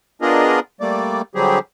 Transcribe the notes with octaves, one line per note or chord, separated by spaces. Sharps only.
B3 D4 F4 G#4 A#4 D#5
G3 A3 A#3 D5
D3 F#3 G3 C4 G4 G#4